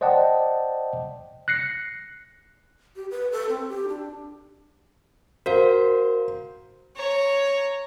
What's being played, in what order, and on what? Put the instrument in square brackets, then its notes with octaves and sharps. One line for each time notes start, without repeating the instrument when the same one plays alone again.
[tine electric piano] C5 D5 D#5 F#5 G5 A5
F#6 A#6 C7 C#7
[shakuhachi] G4
B4
A4
C4
G4
D4
[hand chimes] F#4 A#4 F5 [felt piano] C5
[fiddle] C#5 A#5